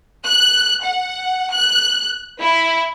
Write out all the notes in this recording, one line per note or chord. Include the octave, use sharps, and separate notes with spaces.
F#6
F#5
F#6
E4